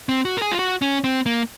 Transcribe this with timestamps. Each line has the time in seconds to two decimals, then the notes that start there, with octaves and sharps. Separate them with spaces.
0.09 C4
0.25 F#4
0.37 A#4
0.42 G#4
0.52 F4
0.59 F#4
0.82 C#4
1.04 C4
1.26 A#3